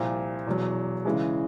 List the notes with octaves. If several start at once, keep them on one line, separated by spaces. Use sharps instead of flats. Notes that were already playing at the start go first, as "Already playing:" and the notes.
Already playing: C2 A#2 F3
E2 B2 F#3
C#3 E3 G#3